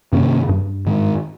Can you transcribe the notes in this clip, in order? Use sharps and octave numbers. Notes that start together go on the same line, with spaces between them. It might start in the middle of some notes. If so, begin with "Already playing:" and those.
G2 C3 D#3 A#3 C#4
G2
G#2 D#3 G#3